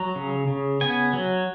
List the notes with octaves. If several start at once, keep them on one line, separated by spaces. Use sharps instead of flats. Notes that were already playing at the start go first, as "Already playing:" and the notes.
Already playing: F#3 A#5
C#3
C#3
B3 G#5
F#3